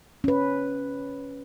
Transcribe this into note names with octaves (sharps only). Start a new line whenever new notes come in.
C#4 B4